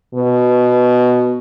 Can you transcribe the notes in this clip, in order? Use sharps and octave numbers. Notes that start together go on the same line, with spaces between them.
B2